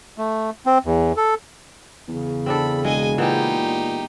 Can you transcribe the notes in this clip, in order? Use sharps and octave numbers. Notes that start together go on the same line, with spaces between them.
A3
C4
E2
A4
E2 C#3
C4 D4 A4 B5
E1 G#3 D#5 G#5
A#2 E3 B3 D#4 G4 C5